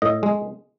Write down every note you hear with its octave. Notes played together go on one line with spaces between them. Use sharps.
A2 D#5
G#3